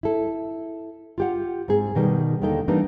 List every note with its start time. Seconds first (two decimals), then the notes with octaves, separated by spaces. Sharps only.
0.03 E4 A4
1.18 F4 G4 F#5
1.68 G#2 C4 G#4
1.95 B2 D#3 G3
2.42 D#2 D3 D#3 D#4 A4 G5
2.68 E3 G3 A#3 B3 D4 D#4